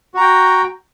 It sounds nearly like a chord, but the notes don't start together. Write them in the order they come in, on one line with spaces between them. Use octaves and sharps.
F#4 A#5 G5